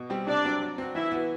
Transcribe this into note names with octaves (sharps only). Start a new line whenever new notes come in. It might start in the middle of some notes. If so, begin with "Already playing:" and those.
Already playing: B2
G3 C4 G4
C3 D4 D5
F#3 C4
F#3
C4 F#4
E3 E4 E5
B3 F#4